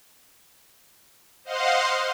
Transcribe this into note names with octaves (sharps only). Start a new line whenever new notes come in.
C5 D#5 F5 F#5 C6